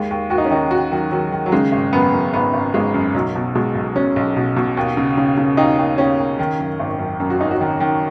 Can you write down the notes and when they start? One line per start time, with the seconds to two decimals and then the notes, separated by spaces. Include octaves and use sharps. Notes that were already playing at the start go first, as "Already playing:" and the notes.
Already playing: D#2 G#3
0.11 D#2
0.30 D#2 F#4
0.38 D#4
0.45 C#4
0.51 D#3 D#4
0.71 D#3 F#4
0.91 D#3 F#3
1.11 D#3 F#3
1.32 D#3
1.46 F#3
1.52 C#3 G#3
1.72 G#1
1.93 F#2 B3
2.13 F#2
2.33 G#1 B3
2.53 G#1
2.74 G#1 G#3
2.94 F#2
3.14 B1 F#3
3.35 B2
3.55 B2 G#3
3.75 B1
3.95 B2 C#4
4.16 B1
4.36 B2
4.56 B2
4.77 D#2
4.97 C#3
5.17 C#3
5.37 C#3
5.57 D#2 D#4
5.78 D#2
5.98 D#2 C#4
6.18 D#2
6.39 D#3
6.59 F#2
6.80 G#1
6.99 F#2
7.20 F#2
7.30 F#4
7.40 G#1 D#4
7.51 F#4
7.61 D#3
7.80 D#3